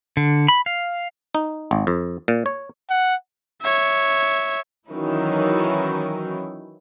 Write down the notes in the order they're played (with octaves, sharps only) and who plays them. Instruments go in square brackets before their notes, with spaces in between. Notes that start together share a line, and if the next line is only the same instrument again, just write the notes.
[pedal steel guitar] D3
B5
F5
[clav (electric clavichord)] D#4
G#1
F2
A#2
C#5
[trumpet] F#5
[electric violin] C#5 E5
[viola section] D#3 E3 F#3 C#4 D#4 E4